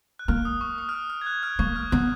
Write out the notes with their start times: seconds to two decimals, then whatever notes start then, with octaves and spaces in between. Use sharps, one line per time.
0.19 F#6
0.28 A#3 F6
0.45 D#6
0.61 C#6
0.78 D#6
0.89 F6
0.94 D#6
1.10 F6
1.21 G#6
1.26 F#6
1.43 F6
1.59 A#3 C#6
1.76 F6
1.91 B3 F#6